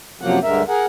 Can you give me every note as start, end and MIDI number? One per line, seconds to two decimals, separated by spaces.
0.22 0.39 42
0.22 0.39 48
0.22 0.39 53
0.22 0.39 54
0.22 0.39 58
0.22 0.39 78
0.43 0.63 38
0.43 0.63 43
0.43 0.63 50
0.43 0.63 56
0.43 0.63 70
0.43 0.63 76
0.68 0.86 68
0.68 0.86 70
0.68 0.86 78